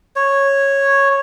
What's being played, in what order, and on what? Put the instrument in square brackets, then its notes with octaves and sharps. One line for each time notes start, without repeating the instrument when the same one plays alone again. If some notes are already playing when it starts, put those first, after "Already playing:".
[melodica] C#5